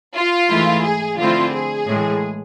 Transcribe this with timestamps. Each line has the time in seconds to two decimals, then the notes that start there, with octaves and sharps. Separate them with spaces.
0.15 F4
0.50 G#2 E3 A3 E4
0.84 G#4
1.18 D3 F3 A3 C4 E4 F4
1.52 G#4
1.87 A2 E3 G#3